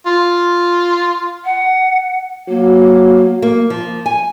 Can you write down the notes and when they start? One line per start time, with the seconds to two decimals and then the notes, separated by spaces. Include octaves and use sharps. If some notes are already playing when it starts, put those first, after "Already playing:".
0.06 F4
1.45 F#5
2.49 F#3 A#3
3.42 A#3
3.70 F3
4.06 G#5